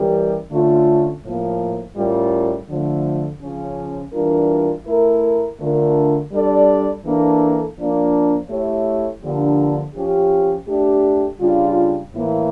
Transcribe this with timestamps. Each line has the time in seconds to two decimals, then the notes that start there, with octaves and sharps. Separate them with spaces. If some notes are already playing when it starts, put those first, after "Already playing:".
Already playing: E3 G3 C#4 G4 A#4
0.51 D3 A3 C#4 F4
1.23 A2 F3 A#3
1.95 A2 G3 C#4 F4 A#4
2.68 D3 F3 A3
3.41 C#3 F3 C#4
4.13 E3 G3 D4 F4 A#4
4.86 A3 E4 A#4
5.59 D3 A3 D4 F4 A#4
6.31 G3 D4 A4 D5
7.04 E3 A#3 D4 A4
7.77 F3 A#3 D4
8.49 A3 E4 G4 C#5
9.23 D3 F3 A#3 D4 G4
9.95 F3 C#4 G4
10.67 A3 D4 G4
11.40 C#3 G3 D4 F4
12.13 A2 E3 A#3 E4